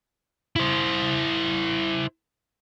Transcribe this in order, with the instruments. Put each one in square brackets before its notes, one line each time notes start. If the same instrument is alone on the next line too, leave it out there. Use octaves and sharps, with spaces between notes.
[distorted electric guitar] E4 C5